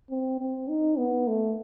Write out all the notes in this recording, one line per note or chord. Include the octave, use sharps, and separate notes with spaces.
C4
C4
D#4
B3
A3